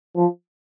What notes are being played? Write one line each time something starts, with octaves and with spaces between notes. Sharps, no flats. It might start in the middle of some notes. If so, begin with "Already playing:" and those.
F3